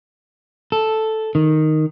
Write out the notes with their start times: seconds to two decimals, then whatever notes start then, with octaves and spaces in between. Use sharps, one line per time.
0.72 A4
1.35 D#3